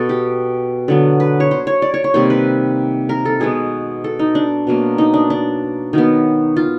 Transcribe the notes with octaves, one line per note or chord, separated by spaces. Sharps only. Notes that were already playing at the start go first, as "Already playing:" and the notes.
Already playing: B2 B3 A4
G4
D3 F#3 B3
B4
C#5
C5
C#5
D5
C#5
C#5
C3 D#3 G3 A#3 C5
B4
A#4
A4
B2 G#3 B3 G#4
A4
D#4
D4
B2 F#3 A#3
D#4
D4
D4
D#3 F#3 B3
F4